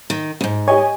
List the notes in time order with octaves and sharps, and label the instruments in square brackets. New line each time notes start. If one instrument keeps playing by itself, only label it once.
[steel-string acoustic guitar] D#3
E2 G#2
[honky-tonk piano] G4 D#5 G#5 [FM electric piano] C#5